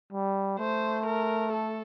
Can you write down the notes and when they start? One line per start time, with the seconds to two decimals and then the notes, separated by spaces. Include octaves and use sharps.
0.13 G3
0.59 A3 C5
1.07 A#4
1.53 A4